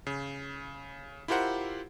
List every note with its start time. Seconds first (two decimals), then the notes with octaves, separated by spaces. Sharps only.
0.07 C#3
1.28 E4 F4 G4 A#4 C5 F#5